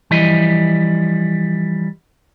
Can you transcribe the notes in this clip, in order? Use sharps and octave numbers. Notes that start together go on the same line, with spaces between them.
E3 F3 G3 E4 D#5